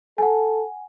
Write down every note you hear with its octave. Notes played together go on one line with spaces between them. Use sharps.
A4 F#5 G#5